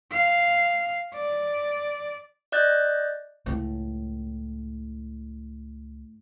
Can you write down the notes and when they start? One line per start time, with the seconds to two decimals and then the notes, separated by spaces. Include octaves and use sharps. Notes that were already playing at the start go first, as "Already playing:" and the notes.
0.12 F5
1.15 D5
2.52 D5 D#5 F#6 G6 A6
3.46 C#2 A2